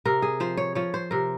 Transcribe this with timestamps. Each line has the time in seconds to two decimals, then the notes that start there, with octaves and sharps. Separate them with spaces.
0.05 C3 A#4
0.22 G#4
0.40 F3 C5
0.57 C#5
0.75 F3 C#5
0.94 C5
1.11 C3 A#4